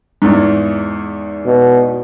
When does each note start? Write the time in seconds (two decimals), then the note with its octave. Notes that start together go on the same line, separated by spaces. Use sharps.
0.22 E2 G#2
1.46 B2